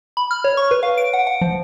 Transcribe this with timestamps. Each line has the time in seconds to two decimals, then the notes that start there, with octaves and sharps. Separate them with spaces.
0.17 B5
0.31 F6
0.44 C#5
0.57 C#6
0.71 B4
0.83 F5
0.98 D7
1.13 F#5
1.27 F#5
1.41 F3